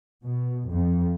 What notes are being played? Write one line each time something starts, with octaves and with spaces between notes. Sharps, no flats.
B2
F2